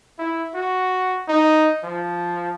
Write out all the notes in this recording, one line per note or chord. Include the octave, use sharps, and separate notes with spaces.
E4
F#4
D#4
F3